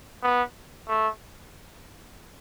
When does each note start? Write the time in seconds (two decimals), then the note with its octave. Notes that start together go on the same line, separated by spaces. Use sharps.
0.23 B3
0.88 A3